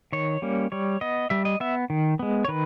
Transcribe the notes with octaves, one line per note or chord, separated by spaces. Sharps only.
D#3 C#5
G3 A#3 C#4
G3 C#5
B3 D#5
G3 E5
D#5
B3 E5
D#3
G#3 B3
C#5
D#3 B4